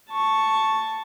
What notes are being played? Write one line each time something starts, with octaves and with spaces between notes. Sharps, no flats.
A5 C#6